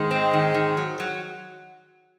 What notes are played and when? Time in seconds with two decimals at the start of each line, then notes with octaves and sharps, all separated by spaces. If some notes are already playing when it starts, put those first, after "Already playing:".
Already playing: G#2 D#3 G#3
0.11 C4
0.33 D#3
0.54 D#3
0.77 F#3
1.00 F#3